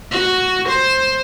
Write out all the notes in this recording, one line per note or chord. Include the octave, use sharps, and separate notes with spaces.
F#4
C5